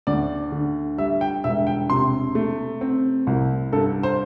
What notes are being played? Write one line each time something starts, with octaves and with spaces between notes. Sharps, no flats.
D2 D5
D3
G3 E5
G5
E1 E5
G5
C3 C6
A3
C4
C2
G2 A4
C5